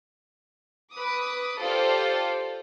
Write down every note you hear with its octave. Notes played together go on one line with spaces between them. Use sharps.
B4 D6 D#6
F4 G4 A4 C5 D5